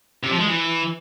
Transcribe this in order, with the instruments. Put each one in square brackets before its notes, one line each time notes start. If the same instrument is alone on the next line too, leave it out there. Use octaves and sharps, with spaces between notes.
[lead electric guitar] C3
F3
G#3
E3